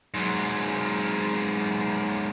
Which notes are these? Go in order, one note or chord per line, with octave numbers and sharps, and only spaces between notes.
G#2 F#3